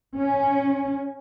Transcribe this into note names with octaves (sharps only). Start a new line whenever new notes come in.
C#4